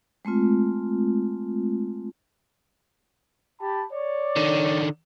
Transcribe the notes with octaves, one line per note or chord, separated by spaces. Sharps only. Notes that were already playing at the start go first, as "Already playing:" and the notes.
G#3 A3 C4 F4
G4 A5 B5
C#5 D5
D3 D#3